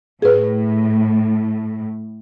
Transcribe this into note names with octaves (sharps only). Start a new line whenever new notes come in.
A2 G#4 B4